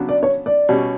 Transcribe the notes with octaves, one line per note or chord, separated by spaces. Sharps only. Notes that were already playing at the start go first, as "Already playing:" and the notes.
Already playing: C#3 F#3 B3 D4 F#4
D5
C#5
D5
B2 G3 C#4